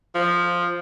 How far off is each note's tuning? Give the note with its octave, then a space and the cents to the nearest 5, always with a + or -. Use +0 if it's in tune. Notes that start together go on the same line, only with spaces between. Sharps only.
F3 +5